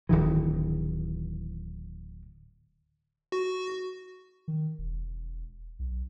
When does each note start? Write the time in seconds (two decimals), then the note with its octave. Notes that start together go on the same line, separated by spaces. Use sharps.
0.09 D1 D#3 E3
3.32 F#4
4.48 D#3
4.78 E1
5.79 B1